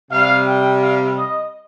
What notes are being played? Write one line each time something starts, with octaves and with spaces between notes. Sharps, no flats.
C3 G3 F5
G5
F5
D#5